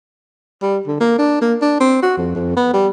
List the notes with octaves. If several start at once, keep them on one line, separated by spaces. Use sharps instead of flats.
G3
D3
A#3
D4
A#3
D4
C4
F#4
F2
F2
B3
G3